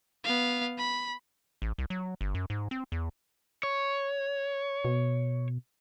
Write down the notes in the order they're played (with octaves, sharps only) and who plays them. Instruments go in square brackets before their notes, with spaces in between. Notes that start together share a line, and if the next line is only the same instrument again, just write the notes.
[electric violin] B3 F5
B5
[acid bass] A1
C2
F#3
G1
F#2
G#2
C4
E2
[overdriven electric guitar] C#5
[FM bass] B2